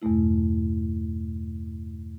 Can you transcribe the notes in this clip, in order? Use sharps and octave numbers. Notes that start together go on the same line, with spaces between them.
E2 G2 B2 A3 E4